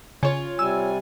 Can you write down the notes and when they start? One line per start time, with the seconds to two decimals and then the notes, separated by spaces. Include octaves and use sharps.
0.23 C#3 F4 C#5
0.59 C3 G3 G#5 E6